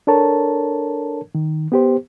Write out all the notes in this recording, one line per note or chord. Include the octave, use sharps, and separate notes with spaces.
D4 A4 A#4 C#5 A5
D#3
B3 G4 C5